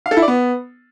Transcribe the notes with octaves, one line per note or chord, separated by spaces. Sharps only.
F5
A4
E4
D5
B3